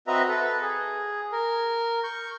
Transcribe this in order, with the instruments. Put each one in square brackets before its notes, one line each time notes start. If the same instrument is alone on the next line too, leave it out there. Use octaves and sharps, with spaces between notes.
[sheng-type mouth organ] C4 F#4 B4 D#5 E5 A#5
A4 B4
G#4
A#4
C#6 G6